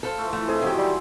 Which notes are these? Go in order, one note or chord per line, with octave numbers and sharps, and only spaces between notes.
A4 B4 C5 F5
A3 F4
E3 F3 A3 E4
F2 E4 G#4
D#3 F#3 G#3 C4 G4
G3